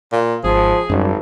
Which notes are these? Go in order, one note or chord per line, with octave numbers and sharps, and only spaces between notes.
A#2
G#1 F3 G#4
G#1 F#2 G3